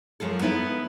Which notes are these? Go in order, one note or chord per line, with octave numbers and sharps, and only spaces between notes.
F#2 F3 G#3 A4
B3 D#4 E4 A4